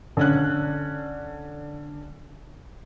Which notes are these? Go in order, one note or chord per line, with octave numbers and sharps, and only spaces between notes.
D3 C#4 F#6